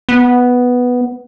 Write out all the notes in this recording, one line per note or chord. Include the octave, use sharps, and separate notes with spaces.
B3